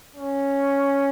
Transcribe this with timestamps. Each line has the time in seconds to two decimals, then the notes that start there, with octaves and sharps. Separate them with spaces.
0.15 C#4